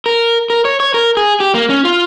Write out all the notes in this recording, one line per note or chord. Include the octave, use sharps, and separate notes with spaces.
A#4
A#4
C#5
C#5
A#4
G#4
G4
A#3
C#4
F4